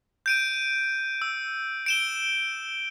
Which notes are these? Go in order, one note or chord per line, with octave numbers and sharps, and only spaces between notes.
G6 D7 D#7
E6
D7 E7 G7